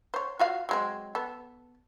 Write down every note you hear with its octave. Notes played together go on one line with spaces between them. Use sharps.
C5 C#5
F4 F#4 F5
F#3 G#3 C4
B3 A4